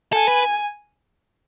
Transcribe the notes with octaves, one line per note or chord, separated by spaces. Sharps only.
A4 G#5
B4